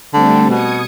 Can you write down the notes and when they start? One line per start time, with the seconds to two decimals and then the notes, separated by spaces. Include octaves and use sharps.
0.14 D3 G3 A3 C4
0.50 B2 D#6 G#6 C#7